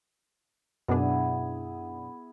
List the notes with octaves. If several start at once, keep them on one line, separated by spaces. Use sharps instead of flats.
F#2 B2 B3 D4 E4 G#4